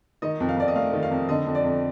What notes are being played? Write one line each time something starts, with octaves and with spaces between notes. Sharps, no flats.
D#3 D#5
F2
F5
F2 D5
D#5
A3 F5
D#3
F5
F2
D3 D#5
F2
D5
F2